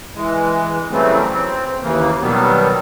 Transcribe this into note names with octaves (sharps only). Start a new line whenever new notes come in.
E3 G#3
C#3 E3 F#3 G3 A3 C4
C4
D#2 C#3 E3 A#3
B2 D#3 F#3 G3 B3